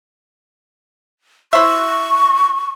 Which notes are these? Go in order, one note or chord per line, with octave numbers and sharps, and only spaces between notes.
E4 C5 E5 C#6